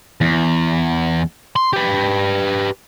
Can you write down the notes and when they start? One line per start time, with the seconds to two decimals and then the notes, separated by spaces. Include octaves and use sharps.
0.21 E2
1.56 C6
1.73 G4 B4